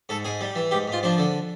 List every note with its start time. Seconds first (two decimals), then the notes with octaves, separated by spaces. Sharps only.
0.09 G#2 A4
0.25 G#2 G#4
0.41 G3
0.56 E3
0.71 G#2 G4
0.88 G#2 F4
1.03 F3 D4
1.18 D3